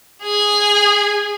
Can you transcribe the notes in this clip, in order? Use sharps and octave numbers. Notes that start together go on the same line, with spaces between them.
G#4 G#5